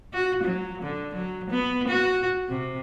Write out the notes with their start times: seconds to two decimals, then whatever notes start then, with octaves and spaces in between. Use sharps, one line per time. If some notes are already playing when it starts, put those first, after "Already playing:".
0.13 F#4
0.44 F#3
0.83 D3
1.15 F#3
1.51 B3
1.88 F#4
2.49 C3